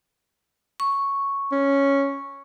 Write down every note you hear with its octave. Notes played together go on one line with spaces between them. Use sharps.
C#6
C#4